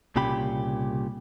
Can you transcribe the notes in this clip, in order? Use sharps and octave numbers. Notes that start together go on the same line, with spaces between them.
C2 A#2 C#3 G4 B5